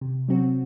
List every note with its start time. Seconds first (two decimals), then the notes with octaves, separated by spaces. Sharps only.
0.01 C3
0.28 F#3 C4 F#4